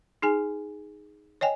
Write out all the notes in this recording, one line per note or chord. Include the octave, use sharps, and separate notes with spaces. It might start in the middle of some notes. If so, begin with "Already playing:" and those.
D#4 G#4 G#5
C#5 D#5 G5 G#5